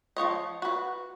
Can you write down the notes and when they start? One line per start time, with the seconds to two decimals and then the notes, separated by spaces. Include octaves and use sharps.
0.16 F3 C4 C#5 D#5
0.62 F#4 B4